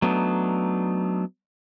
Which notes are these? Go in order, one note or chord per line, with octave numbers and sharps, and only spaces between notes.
F#3 A3 B3 D4 D#4